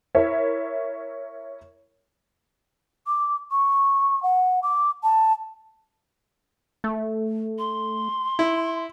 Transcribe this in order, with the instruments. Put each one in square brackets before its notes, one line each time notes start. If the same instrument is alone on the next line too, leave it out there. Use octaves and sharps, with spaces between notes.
[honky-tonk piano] E4 A#4 C#5 E5
[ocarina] D6
C#6
F#5
D6
A5
[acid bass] A3
[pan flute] C6
[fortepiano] E4